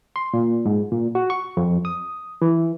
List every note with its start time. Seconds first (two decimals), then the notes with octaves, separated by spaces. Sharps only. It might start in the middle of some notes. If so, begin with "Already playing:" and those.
0.16 C6
0.34 A#2
0.65 G#2
0.91 A#2
1.15 F#4
1.30 C#6
1.57 F2
1.85 D#6
2.42 E3